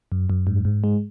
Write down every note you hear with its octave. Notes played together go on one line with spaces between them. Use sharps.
F#2
F#2
G#2
G#2
G#3